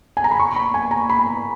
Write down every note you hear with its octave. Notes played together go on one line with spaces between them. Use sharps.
G#5
A#5
B5
C#6
B5
G#5
A#5
B5